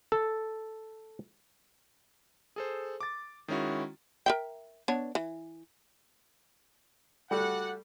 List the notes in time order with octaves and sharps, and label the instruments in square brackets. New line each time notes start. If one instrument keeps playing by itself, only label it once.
[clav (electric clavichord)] A4
[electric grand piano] G#4 A4 C5
D6 A6
D#3 G#3 C#4 E4 F#4
[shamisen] A#4 E5 G5
B3 D4 C#5
E3
[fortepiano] G3 A3 [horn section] F#4 D5 F#5